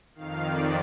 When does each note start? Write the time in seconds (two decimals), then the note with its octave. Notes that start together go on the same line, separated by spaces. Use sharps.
0.15 F2 D#3 F5
0.44 D5